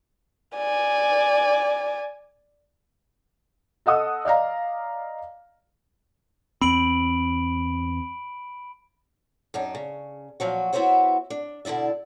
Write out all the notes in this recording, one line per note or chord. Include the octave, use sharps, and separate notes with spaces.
D5 G#5
A4 D#5 F#5 D#6 E6
D5 D#5 F5 A#5
E2 C4 B5 D7 F#7
F#2 D4 D#4
C#3
A#2 F3 F#3 F#4
B3 E4 F#4 C5 C#5 E5
D4
B2 D3 E4 D5 E5